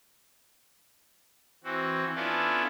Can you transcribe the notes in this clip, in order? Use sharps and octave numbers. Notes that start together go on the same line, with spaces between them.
E3 C4 F#4
B3 C#4 D4 E4 F4 A4